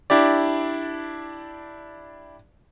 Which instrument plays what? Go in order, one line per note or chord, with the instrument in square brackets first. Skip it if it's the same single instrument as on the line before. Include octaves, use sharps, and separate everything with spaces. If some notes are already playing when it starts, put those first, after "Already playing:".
[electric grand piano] D4 E4 G4 D5